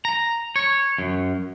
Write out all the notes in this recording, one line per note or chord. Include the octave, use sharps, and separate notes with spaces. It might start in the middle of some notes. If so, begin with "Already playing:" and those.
A#5
C#5
F#2